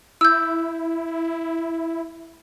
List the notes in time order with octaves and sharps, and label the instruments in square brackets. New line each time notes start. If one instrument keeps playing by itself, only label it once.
[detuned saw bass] E4 [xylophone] E6 G6